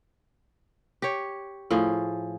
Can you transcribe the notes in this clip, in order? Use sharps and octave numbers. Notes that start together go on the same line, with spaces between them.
G4 C#5
A2 F3 G#4